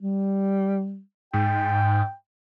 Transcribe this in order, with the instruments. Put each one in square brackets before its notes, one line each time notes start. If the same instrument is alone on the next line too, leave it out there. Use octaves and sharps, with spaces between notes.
[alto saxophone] G3
[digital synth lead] G#2 [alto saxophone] G5